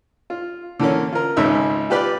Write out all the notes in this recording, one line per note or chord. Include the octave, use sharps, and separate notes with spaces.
F4
D3 E3 A#3 C#4
F4 A#4
G#1 C#2 D#3 E5 E6
F4 G4 B4 D5